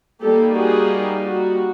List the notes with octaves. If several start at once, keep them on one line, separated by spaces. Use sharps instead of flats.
G3 A#3 D#4 G4 A4
F#4 G#4
F#4